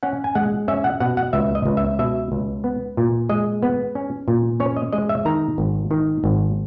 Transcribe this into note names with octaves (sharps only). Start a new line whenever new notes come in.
C#4 F#5
G#5
G#3 F#5
C#4 E5
F#5
B2 F#5
F#5
C#2 E5
D#5
C#2
E5
B2 E5
C#2
B3
A#2
G#3 D#5
B3
C#4
A#2
C#4 C#5
D#5
G#3 D#5
E5
D#3 A#5
G#1
D#3
G#1